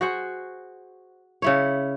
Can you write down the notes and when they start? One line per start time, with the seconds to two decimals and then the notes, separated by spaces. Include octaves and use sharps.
0.01 F#4 G#4 C5 F#5
1.42 C#3 E4 C#5